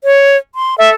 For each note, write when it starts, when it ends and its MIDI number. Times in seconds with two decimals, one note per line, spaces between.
0.04 0.37 73
0.55 0.75 84
0.78 0.95 69
0.78 0.90 76